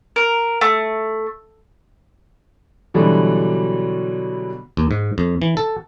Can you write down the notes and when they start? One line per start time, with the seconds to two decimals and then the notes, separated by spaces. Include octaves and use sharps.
0.16 A#4
0.61 A3
2.94 B2 D3 E3 F#3 G3
4.77 D#2
4.91 G#2
5.18 F2
5.42 E3
5.57 A4